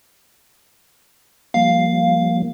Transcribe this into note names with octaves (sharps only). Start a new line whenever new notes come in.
F3 G3 A#3 F5